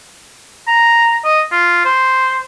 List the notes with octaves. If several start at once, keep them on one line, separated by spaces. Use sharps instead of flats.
A#5
D#5
F4
C5